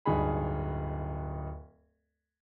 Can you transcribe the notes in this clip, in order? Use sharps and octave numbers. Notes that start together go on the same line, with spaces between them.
D1 G2 D#4 G#4 B5